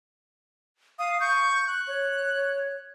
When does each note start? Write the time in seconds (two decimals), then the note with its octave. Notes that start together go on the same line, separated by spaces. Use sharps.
0.99 F5 D#6
1.20 C#6 G6
1.67 F#6
1.87 C#5